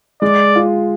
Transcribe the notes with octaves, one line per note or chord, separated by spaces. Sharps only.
G#3 D5
F4